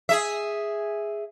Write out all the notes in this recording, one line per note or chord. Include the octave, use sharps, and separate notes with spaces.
G#4 E5